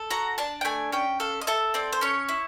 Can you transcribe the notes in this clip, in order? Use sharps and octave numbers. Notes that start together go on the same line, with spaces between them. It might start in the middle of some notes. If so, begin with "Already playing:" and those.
Already playing: A4
F#4 A#5
D4 A5
G5
A3 G#5
C#4 G5
A4 F5
D#5
A4 E5
C4 D5
C5
C#4 C#5
E4